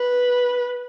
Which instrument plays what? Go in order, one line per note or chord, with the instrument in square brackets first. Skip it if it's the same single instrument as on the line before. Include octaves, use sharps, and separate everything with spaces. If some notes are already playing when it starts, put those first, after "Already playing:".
Already playing: [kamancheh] B4